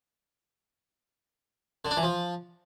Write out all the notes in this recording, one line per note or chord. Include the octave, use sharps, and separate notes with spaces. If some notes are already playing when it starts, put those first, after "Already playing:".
D3
D4
E3
F3